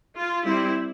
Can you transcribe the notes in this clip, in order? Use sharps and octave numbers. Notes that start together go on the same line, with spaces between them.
F4
G3 C4 E4